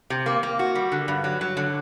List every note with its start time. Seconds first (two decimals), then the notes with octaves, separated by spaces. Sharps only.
0.10 C3
0.26 A#3
0.43 A#3
0.59 F#4
0.75 G3
0.92 D3
1.08 G2
1.24 F#3
1.41 F#3
1.57 D3